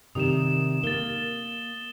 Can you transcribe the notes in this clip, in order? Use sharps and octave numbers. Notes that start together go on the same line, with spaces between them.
C3 D#3 G3 D#6 E7
A#3 A6 G7